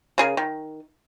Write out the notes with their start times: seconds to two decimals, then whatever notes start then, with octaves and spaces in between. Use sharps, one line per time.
0.18 C#3 G#4 A#4
0.37 D#3